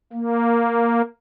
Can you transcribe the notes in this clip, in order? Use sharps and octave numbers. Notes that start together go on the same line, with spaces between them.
A#3